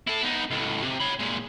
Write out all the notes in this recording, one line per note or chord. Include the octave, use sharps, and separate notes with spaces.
E4 A4
B3 D#4
C#2 A2
C3
C#5 B5
A#2 G#3